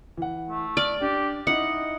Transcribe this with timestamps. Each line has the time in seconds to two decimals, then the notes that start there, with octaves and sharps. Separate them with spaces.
0.17 E3 F#5
0.50 A3
0.77 D5 F6
1.01 D4 G4
1.47 D#4 E4 D#5 F#5